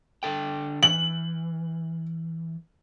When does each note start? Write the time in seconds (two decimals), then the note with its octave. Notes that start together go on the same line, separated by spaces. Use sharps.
0.23 D3 A4 G5
0.83 E3 F#7